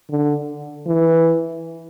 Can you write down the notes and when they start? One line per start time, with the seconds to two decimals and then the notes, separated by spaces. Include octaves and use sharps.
0.10 D3
0.87 E3